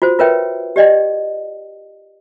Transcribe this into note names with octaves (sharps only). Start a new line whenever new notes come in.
F4 F#4 C5
F4 A#4 B4 C#5 E5 G5
G4 D5 D#5 G5